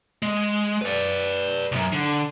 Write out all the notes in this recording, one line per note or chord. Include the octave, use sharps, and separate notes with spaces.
G#3
B4 D5
C2 F#2
D3